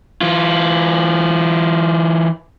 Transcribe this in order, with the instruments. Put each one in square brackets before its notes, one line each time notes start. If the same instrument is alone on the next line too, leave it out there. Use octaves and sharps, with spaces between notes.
[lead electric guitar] E3 F4